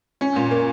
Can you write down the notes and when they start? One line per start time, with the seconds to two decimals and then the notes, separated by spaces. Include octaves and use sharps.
0.21 C#4
0.36 A#2
0.51 A#3